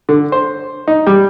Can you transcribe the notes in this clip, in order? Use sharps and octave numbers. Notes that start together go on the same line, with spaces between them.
D3
C5
D#4
G3